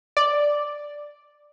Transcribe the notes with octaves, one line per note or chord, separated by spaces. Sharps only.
D5